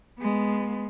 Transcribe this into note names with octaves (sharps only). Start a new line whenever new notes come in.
G#3 B3